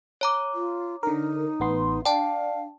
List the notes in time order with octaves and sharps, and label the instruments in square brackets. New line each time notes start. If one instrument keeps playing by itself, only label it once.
[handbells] C#5 A#5 D6
[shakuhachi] F4
[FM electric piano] D3 A#4 [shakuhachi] D#4
[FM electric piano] A1 B3 C6
[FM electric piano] D4 [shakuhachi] F5 [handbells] G5 A5